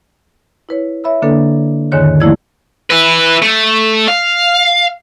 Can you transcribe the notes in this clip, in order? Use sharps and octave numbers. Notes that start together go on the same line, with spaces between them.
E4 B4 C#5
C#5 E5 B5 E6
D3 A#3 D4 A4 B4
E2 G#2 D3 D#3 C#5 F#6
F3 A3 A#3 E4 D5 G#6
E4 B4
A3
F5